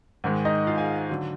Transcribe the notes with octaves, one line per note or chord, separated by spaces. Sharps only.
G#2 D#3 G#3
D#4 D#5
F4 F5
G#4 G#5
D3 F#3